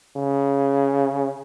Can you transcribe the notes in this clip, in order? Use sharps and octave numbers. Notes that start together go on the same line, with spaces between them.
C#3